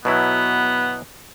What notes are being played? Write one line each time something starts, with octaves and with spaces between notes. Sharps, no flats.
B2 F#3 B3 E4